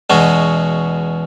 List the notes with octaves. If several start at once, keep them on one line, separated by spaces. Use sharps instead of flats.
E2 B2 G#3 C#4 F#4